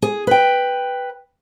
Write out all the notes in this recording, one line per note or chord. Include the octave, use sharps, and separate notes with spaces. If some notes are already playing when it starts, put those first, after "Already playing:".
G#4
B4 G5